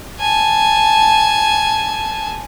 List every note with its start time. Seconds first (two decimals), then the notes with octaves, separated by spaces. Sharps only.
0.20 G#5 A5